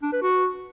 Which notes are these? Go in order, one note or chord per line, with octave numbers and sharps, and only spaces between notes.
D4
B4
F#4